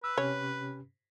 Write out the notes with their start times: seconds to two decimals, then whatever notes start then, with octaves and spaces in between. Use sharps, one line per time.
0.04 B4 E6
0.18 C3 C#4 G4 C#5